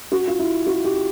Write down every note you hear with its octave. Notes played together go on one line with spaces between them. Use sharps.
F#4
F4
E4
F#4
G4